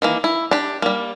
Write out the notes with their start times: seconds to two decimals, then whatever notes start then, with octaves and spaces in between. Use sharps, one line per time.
0.02 D#3 E3 A#3
0.24 E4
0.51 D4 G4
0.82 G3 A#3